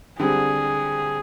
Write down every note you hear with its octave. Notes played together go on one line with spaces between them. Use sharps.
D3 G3 C4 G#4